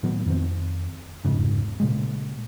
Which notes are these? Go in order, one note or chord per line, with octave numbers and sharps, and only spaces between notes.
A2 D#3 F#3 B3
F2 D#3 C4
F1 E2 G#2 C#3
A#2 C#3 G#3